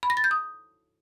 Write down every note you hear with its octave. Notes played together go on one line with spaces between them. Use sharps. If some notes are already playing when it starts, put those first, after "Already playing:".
B5
A#6
A6
G6
D#6